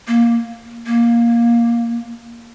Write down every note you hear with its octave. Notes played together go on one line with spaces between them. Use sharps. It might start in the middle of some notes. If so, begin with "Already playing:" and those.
A#3
A#3